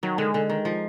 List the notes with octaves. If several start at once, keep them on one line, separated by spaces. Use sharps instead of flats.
D#3 F#3
D3 G#3
D3
D#3
F3